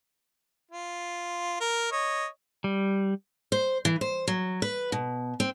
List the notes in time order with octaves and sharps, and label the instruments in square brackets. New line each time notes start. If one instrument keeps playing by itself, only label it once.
[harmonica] F4
A#4
C#5 D#5
[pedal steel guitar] G3
[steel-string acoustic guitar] C5
E3
C5
F#3
B4
B2
C4